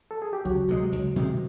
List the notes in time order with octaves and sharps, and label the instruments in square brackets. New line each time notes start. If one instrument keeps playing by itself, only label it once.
[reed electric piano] A4
G#4
G4
[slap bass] C#2 [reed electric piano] F#3 F#4
[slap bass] C3 D#3 G#3
C#2
C3 D#3 G#3